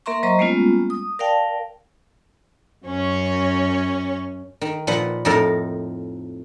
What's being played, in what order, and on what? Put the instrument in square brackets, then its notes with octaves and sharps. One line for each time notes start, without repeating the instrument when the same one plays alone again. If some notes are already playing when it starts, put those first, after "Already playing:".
[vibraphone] A#3 A#4 E5 A#5 C6 C#6
F#3 C5 D#5 A#5 C#6
G3 G#3 A#3 B3 C#4 F4
D#6
A#4 D5 F5 G5 A5
[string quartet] F#2 C#4 C#5
[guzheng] D#3
A#2 F3 B4 F#5
F2 A2 D#4 A4 A#4